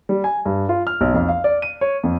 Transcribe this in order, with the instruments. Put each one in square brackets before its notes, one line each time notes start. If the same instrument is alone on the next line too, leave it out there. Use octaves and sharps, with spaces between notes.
[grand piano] G3
G#5
G2
F4
F6
B1
F2
F5
D5
D#7
C#5
F2